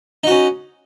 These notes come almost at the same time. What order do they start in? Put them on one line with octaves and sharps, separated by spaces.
D#4 F#4 C#4